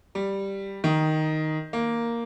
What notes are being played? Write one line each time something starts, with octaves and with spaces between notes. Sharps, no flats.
G3
D#3
A#3